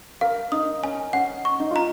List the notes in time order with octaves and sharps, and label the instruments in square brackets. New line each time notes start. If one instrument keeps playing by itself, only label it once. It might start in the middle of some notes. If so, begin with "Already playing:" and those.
[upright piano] A#4 [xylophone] F5
[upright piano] D#4 [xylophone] D#6
[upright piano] C#4 [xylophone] G#5
[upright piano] C#4 [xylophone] F#5
[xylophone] C#6
[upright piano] D#4
F4
[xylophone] A#5